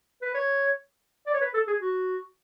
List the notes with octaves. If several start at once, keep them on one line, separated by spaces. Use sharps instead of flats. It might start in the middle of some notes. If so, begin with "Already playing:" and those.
B4
C#5
D5
C#5
B4
A4
G#4
F#4